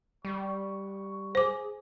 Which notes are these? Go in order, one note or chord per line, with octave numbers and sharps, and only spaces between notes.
G3 C#6
G#4 C5 D6